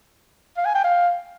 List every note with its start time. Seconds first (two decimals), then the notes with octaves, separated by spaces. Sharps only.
0.57 F5
0.65 G#5
0.75 G5
0.84 F5